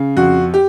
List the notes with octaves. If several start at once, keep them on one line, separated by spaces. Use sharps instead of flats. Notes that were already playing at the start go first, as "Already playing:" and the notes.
Already playing: C#3
F2 F#4
G4